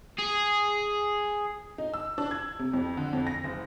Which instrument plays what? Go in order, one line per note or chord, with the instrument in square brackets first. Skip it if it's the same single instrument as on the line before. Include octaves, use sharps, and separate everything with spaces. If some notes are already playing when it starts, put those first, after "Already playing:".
[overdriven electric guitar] G#4
[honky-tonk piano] D#4
E6
D4
G#6
C3
F2
D3
F2
A#6
F#1